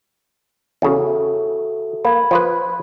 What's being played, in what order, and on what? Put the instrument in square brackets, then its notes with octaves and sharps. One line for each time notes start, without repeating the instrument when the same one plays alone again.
[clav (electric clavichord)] E2 C#3 [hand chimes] F#4 A4 E5
[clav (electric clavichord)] A#3 [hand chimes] B5 G#6
[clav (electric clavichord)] F3 F4 B4